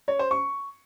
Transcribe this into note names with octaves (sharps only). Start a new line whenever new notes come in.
C#5
C5
C#6